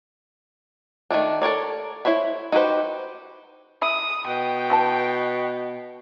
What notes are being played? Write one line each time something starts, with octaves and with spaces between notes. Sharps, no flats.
D#3 G3 A3 D4
A4 A#4 C#5 D5
E4 C5 C#5 B5
D#4 F#4 G4 B4 C5
E4 D#6
B2 G5
E3 B4 A5